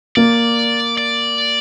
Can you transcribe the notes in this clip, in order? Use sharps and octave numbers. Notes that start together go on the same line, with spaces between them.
A#3 D5
D5